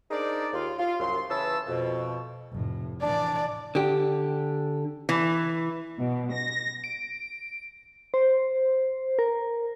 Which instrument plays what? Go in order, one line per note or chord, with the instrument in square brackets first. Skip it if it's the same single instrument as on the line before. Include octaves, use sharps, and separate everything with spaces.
[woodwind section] D4 D#4 G#4 A#4 C5 D5
D#2 F4
F4
C2 F#2 C6
C#3 E3 B4 C#5 A5 E6
F2 B2
[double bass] F1 A2
[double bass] A2 E3 [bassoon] D4 [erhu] D5
[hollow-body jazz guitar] D3 G4
[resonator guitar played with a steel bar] E3
[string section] B2
A#6
[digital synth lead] D7
C5
A#4